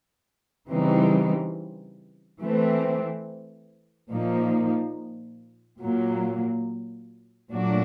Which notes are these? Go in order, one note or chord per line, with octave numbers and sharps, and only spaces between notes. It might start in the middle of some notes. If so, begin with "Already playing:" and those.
C#3 E3 G3 C4 D#4
E3 A3 C4
A#2 F3 A#3 D#4
A#2 F#3 A#3
A#2 F#3 A3 D4 F#4